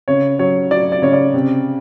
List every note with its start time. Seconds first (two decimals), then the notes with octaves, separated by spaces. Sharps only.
0.08 C#3 C#5
0.39 F#3 C#5
0.71 F#3 D5
0.92 D5
1.02 C#3 C#5
1.13 D5
1.34 C3